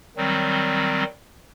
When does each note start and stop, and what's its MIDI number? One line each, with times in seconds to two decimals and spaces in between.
0.17 1.03 51
0.17 1.03 54
0.17 1.03 55
0.17 1.03 60